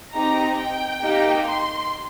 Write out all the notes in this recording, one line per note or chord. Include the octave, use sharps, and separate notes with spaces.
C4 D#4 G4 A#5
G5
A#3 D#4 G4
C6